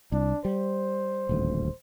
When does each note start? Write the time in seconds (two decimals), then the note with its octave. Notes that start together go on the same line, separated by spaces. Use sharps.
0.12 C2 D4
0.45 G3 C5
1.29 D#1 A1 D2